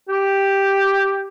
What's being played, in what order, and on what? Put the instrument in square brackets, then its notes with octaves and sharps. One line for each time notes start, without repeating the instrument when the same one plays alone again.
[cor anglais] G4